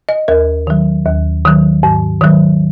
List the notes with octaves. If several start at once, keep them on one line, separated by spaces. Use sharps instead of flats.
D#5
D#2 A#4
D#3 F#3
D#2
D#3 F#3
G#2
D#3 F#3